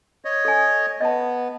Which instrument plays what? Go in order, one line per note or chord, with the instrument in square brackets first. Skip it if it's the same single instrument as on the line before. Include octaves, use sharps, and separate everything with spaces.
[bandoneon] C#5 D#5
[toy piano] A4 G#5
[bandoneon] B3 [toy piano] D#5 A5